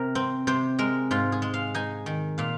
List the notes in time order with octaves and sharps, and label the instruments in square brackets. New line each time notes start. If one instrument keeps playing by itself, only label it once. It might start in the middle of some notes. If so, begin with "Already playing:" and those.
Already playing: [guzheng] C3 A#4
C4
C3 C5
G#3 A#4
G#2 F4
G#4
G#3
F5
D#4 G#5
D#3
A#2 F5